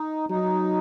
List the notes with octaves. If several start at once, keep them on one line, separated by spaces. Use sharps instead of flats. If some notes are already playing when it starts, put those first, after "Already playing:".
Already playing: D#4
F#3 D#4